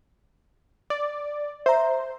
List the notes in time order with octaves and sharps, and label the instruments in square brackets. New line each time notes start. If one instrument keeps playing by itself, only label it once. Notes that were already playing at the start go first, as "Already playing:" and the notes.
[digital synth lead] D5
[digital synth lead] C5 [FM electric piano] E5 A#5